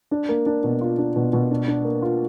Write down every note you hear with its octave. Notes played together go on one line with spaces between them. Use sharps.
D4
A#3
D4
B2
F4
D4
B2
B2
D4
D4
A#3
F4